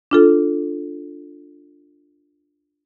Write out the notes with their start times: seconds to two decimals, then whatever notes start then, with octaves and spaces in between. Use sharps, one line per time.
0.11 D4 F4 A4